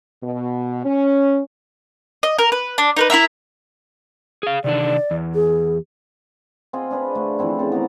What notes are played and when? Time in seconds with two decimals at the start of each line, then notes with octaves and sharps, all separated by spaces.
0.24 B2
0.86 C#4
2.23 D#5
2.39 A#4
2.52 B4
2.78 D4
2.97 D#4 A#4 B4
3.10 E4 F4 A#4 E5
4.43 G#4 F5
4.64 C3 D#3 D4 D5
5.11 E2
5.35 G#4
6.73 C4 F4 G#4 D#5
6.91 D4 G#4 B4 D#5
7.14 D3 A3
7.39 E3 F3 C4 E4
7.59 C#3 C4 A4
7.72 B3 D5 A#5